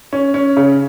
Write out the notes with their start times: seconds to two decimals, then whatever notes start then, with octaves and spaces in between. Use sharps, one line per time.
0.13 C#4
0.34 C#4
0.57 C#3